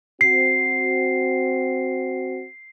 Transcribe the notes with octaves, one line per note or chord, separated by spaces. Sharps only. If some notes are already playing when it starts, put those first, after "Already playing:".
C4 F#4 C7